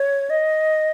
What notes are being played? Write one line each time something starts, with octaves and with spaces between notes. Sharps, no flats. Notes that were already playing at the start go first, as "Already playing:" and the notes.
Already playing: C#5
D#5